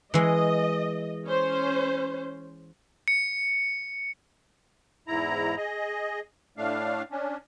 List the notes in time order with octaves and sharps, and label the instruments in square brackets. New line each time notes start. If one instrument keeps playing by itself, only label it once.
[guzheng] E3 G#3 [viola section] D#5
[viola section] C#4 C5
[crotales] C#7
[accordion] E2 G#2 E4 A#5
G#4 D#5
A2 A3 D4 F5
C#4 D4